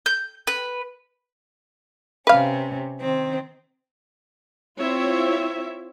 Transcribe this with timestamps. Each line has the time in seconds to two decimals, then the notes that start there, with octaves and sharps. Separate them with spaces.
0.06 G6
0.47 B4
2.27 C3 C#4 B4 F5
2.99 D#3 C4
4.79 C4 E4 F4 C#5 E5